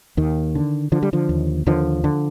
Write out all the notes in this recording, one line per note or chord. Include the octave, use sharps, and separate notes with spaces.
D#2 D#3
D3
D3 F3
G3
D3 F3
D#2
D#2 D3 F3
D3